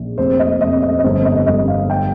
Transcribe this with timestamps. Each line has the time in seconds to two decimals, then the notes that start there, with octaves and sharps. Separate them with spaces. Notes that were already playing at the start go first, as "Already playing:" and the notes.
Already playing: A#1
0.18 F1 C5
0.39 D#5
0.60 F1 D#5
0.82 D#5
0.99 D#5
1.04 G1 C5
1.25 D#5
1.46 G1 D#5
1.68 F5
1.90 G5